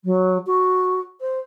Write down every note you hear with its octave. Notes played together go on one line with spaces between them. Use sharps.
F#3
F#4
C5